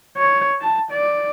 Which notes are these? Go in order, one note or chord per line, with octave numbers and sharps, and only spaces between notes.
C#5
A5
D5